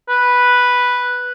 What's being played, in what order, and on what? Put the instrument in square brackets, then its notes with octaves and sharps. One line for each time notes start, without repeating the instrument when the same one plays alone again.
[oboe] B4